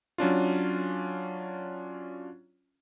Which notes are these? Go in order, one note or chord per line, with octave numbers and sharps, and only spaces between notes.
F#3 C#4 D4 F4